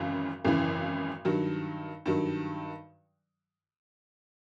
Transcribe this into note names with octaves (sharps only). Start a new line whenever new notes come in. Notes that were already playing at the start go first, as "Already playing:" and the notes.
Already playing: G#1 F#2 C#3 E3
G#1 F#2 C#3 E3
G2 D#3 F#3
G2 D#3 F#3